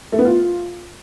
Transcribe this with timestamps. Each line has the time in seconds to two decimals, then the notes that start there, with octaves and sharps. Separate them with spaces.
0.12 A3
0.19 B3
0.25 F4